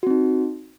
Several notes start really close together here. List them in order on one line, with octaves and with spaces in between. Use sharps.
F#4 C4 D#4